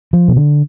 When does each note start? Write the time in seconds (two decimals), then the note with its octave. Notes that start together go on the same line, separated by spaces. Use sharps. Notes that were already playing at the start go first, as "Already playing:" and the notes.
0.13 F3
0.28 B2
0.36 D3